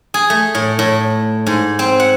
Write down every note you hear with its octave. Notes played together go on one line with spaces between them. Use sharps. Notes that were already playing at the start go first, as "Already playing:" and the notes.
G#4
A3
A2
A2
G#2
C4
F#5